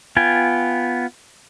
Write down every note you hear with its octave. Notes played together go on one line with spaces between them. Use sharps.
B3 F4 G5 G#5